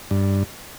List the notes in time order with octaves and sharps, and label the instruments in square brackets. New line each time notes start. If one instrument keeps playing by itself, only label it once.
[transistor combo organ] G2